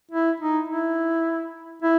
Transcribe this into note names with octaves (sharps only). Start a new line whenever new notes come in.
E4
D#4
E4
E4